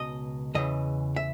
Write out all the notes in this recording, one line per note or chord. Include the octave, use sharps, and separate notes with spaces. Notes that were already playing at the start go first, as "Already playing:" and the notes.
Already playing: C#2 B2 D#5
E2 C#3 E3 D#5
E5